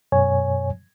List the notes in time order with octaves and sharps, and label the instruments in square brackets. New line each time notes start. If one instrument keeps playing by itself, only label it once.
[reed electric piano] F#2 B2 C#5 G#5